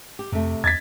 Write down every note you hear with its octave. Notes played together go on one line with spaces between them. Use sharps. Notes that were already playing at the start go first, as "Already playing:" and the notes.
G4
F2 C3 A3
E2 G#6 A6 B6